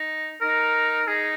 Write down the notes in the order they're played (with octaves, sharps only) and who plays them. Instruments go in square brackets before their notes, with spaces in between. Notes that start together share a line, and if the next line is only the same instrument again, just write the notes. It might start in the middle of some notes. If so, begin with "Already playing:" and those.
Already playing: [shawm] D#4
[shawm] D#4 [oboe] A#4
[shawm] D#4 [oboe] G#4